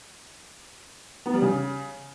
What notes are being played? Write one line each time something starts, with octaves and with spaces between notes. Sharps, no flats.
B3
G3
C#3